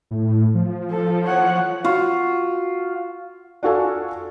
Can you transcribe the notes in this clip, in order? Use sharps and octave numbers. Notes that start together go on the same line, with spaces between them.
A2
F3
A4
C#5 F#5
F4 F#4
D4 F4 F#4 A4 F5 G#5